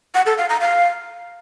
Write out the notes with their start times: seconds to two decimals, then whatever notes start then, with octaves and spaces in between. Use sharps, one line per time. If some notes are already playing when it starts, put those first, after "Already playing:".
0.15 F#5
0.26 A4
0.38 F5
0.49 A#5
0.61 F5